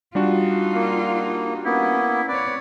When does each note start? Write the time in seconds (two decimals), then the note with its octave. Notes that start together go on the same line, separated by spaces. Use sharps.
0.15 G3 D4 D#4 F4 F#4
0.74 A#3
1.65 A#3 B3 C#4 E4
2.29 C4 B4 C#5 D5